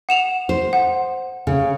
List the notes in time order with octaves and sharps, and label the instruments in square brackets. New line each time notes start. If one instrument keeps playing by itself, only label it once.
[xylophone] F#5 E7 F7
[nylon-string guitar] C5
[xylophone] F#5
[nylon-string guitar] C#3